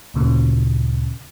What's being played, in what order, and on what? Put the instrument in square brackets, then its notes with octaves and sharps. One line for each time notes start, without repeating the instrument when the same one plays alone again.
[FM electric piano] D2 A#2 C#3